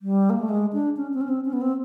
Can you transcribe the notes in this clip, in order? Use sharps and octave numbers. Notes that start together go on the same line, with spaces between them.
G3
A#3
A3
G#3
D4
C#4
C4
C#4
C4
C#4
B3
C4